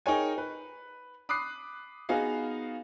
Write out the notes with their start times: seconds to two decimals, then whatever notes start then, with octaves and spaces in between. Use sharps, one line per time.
0.06 D#4 G#4 A#4 C#5 G5 G#5
0.38 B4
1.29 B5 D6 D#6 F#6 C7
2.09 B3 D#4 F#4 G#4 F5